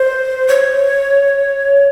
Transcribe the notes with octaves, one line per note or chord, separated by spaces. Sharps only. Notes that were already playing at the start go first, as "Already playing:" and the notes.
Already playing: C5
C#5